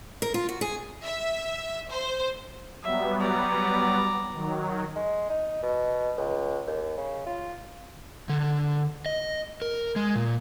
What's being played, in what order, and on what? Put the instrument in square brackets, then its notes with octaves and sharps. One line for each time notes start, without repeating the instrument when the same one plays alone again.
[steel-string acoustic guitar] A#4
F4
F#4
G#4
[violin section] E5
C5
[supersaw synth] F#3 G3 B3 [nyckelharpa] E5
[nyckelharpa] D5 A#5
[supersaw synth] D#3 F#3
[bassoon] G#3
D#4
B2
C#2
D#2
C#3
F4
[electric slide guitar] D3
D#5
A#4
G#3
A#2